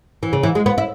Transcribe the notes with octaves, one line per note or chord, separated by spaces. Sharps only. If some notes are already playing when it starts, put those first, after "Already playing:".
E3
C#3
E3
G#3
B3
E4